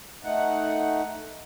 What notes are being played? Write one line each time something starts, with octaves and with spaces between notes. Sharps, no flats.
A3 D#4 F#5